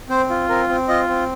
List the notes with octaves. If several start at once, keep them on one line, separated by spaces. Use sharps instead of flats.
C4 C5
F4
C4 A#4
C4
F4 D#5
C4